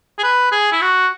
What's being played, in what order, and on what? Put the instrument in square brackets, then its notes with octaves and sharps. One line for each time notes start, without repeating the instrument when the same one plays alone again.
[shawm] G#4
B4
G#4
E4
F#4